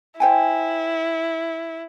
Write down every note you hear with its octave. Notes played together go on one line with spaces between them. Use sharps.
E4 C5 G5 G#5